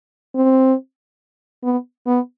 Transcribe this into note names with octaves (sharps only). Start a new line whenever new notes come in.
C4
B3
B3